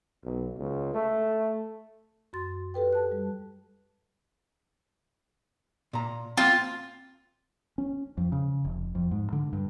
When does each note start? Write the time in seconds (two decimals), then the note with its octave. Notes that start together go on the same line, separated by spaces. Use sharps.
0.24 B1
0.58 C#2
0.94 A3
2.33 F#2 F#4 C6 A6
2.74 G4 A4 B4 G5
2.93 A5 F#6
3.12 G3
5.93 A#2 A#5
6.37 A#3 C4 F4 F5
7.78 C#4
8.17 F2
8.32 C#3
8.65 F1
8.95 F2
9.11 G#2
9.33 D3
9.53 G2